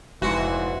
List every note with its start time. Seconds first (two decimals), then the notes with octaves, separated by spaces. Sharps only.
0.22 F1 G#2 E3 F#4 C6